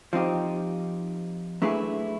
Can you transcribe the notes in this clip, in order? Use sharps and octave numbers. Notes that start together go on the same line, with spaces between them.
F3 C4 D#4 G4
F#3 A3 D4 E4 G#4 B4